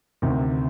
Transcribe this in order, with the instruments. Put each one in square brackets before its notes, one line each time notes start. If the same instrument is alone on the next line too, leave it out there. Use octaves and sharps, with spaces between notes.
[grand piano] D2 C3 D#3